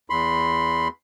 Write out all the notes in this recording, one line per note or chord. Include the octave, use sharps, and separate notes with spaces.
E2 B5 C6